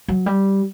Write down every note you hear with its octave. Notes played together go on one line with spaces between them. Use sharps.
F#3
G3